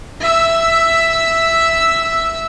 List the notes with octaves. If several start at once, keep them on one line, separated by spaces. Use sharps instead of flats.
E5 E6